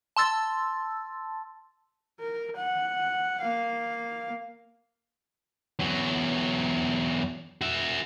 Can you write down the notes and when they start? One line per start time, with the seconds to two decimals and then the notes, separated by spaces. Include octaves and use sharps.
0.16 A5 C6 E6 A6
2.19 A#4
2.56 F#5
3.41 A#3 F5
5.79 E2 F#3
7.61 F#4 E5